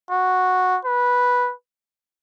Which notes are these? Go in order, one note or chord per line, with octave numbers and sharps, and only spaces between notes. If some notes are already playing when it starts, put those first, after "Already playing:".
F#4
B4